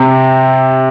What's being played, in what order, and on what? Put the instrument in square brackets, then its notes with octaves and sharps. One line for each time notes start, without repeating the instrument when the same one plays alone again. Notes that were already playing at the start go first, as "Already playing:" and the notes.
Already playing: [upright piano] C3